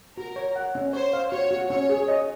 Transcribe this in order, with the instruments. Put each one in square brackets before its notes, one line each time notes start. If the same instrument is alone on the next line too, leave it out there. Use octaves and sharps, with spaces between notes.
[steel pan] F#4 [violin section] A#4
[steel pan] C#5
F#5
C#4
[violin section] C5 [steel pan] C#5
[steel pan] F5
[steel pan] F#4 [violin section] C#5
[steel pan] F#4
[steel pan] C#4 [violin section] C#5
[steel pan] G#4
D#5